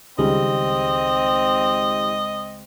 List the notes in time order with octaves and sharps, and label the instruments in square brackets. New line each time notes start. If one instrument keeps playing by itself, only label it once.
[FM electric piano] C#2 G#3 [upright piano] D#3 G3 [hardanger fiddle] C4 [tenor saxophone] D#5